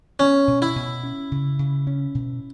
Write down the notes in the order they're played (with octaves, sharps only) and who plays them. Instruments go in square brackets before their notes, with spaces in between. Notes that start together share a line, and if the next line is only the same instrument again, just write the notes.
[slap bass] B3 [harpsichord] C#4
[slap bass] B2
[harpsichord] E4
[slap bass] B2
C#4
C#3
C#3
C#4
B2